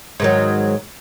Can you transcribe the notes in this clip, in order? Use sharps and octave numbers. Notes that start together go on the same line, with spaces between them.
G#2 D#3 F#3